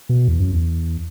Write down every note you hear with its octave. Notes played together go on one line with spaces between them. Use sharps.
B2
E2
F#2
E2